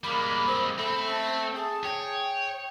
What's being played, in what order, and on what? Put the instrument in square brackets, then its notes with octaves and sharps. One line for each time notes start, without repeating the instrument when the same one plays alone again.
[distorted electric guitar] G3 G#3 [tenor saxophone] A#3 [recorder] B5
[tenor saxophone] C4
[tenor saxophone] A3 [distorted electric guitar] C4 [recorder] B5
[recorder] A5
[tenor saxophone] G#4 [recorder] A5
[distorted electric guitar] C#5 [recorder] G5